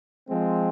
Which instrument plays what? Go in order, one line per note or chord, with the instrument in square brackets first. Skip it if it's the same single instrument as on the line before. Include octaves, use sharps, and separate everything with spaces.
[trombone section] F3 G#3 C4